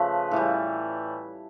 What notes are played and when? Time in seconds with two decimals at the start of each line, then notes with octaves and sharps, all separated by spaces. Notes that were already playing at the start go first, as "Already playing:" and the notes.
Already playing: C#3 F3 A3 B4
0.31 A2 E3 G3